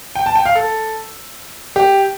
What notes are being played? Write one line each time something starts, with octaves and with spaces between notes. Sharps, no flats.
G5
A5
G5
F5
A4
G4